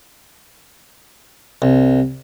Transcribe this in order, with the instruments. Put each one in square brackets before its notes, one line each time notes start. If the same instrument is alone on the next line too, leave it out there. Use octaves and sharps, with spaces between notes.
[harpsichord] C2